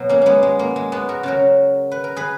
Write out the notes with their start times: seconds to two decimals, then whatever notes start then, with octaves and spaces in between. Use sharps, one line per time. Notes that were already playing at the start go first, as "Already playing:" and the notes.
Already playing: B2 F#3
0.09 A#3 C#4
0.22 G#3 A#3 B3
0.43 G#3
0.59 A#3
0.76 G#3
0.92 G#3 B3
1.09 F#4 A#4
1.23 C#3 F#3 F#4 A#4
1.91 B4
2.04 A#4
2.16 G#4 B4